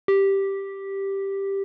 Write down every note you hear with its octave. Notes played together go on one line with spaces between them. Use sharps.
G4